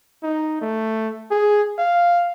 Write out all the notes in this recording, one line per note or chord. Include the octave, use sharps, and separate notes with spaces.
D#4
A3
G#4
F5